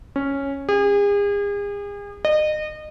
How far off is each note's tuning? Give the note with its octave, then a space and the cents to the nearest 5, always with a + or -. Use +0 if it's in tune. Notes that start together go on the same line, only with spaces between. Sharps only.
C#4 -5
G#4 -40
D#5 -30